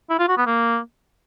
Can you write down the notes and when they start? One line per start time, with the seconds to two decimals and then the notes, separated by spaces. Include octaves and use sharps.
0.10 E4
0.19 F4
0.28 F#4
0.38 B3
0.47 A#3